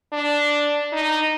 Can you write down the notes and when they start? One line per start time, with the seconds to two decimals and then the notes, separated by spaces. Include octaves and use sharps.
0.12 D4
0.93 D#4